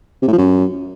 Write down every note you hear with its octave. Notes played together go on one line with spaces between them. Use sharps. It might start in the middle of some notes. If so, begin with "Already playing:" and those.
C3
A2
F3
F#2